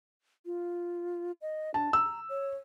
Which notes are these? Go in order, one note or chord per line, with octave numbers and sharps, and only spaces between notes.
F4
D#5
D4 A5
A#5 E6
C#5